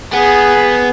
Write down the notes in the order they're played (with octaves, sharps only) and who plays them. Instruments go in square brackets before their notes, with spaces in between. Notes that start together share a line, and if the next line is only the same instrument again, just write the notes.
[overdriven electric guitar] B3 [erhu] G#4